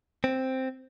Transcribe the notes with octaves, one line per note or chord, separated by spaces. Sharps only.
C4